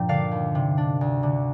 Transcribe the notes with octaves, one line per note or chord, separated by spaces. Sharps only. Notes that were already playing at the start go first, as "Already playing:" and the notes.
Already playing: G2 A#2 F3 G5 A#5
D3 D5 F5
D#2
C3
D4
D2
D3